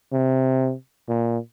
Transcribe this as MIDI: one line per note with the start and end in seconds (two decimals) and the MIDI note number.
0.12 0.73 48
1.08 1.38 46